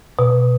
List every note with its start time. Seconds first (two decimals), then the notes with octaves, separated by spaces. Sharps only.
0.19 B2